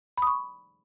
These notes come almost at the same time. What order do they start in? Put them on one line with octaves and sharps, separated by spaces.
B5 D#6 C#6